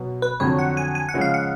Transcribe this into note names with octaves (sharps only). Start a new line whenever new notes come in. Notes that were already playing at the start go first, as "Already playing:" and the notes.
Already playing: B2 F#3 B3
B4
F2 D3 F#3 C#5
F#5
G#5
G#5
F#5
C#3 F3 G#3 C#4
F5
F#5